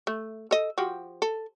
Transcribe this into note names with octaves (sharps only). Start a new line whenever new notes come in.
A3
A4 D#5
F3 F#4 G4
A4